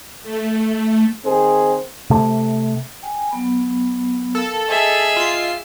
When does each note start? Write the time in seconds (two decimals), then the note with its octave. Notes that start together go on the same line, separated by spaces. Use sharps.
0.23 A3
1.23 D#3 C4 G#4 C5
2.10 C3 A3
3.02 G5 G#5
3.31 F#3 B3 B5
4.35 A4 A#4 F5
4.69 G#4 D#5 E5 G5 E6
5.17 F4 C7